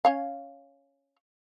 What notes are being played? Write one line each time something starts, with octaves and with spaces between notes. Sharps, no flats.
C#4 C#5 F5